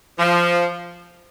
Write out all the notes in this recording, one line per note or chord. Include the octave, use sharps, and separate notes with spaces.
F3